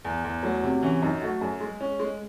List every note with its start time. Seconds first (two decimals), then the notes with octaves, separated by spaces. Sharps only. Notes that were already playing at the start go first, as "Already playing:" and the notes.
0.05 E2
0.24 E2
0.43 F#3 A3
0.63 C3
0.83 E3 C#4
1.02 F#2 D#4
1.22 A3 F#4
1.41 F#2 G#4
1.60 G#3
1.81 C#4
1.99 G#3